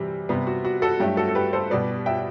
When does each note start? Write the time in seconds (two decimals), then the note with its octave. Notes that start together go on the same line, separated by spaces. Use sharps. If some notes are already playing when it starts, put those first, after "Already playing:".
Already playing: C3 E3 G3
0.29 C3 G3 B3
0.47 F#4
0.65 F#4
0.82 F#4 A4
1.00 G2 F#3 A3 G4
1.17 F#4 A4
1.29 A4
1.35 G4 B4
1.53 A4 C5
1.70 B2 G3 B3 B4 D5
2.06 E5 G5